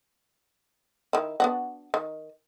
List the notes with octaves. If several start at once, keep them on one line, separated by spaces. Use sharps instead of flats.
D#3 E4
B3 D4 F#4
D#3